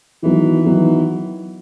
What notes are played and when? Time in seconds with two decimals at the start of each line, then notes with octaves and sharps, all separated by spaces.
0.23 D#3 E3 F#3 B3
0.65 D#3 F#3 B3